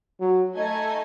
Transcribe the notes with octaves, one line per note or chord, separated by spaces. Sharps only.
F#3
A3 D#4 A4 D#5 G#5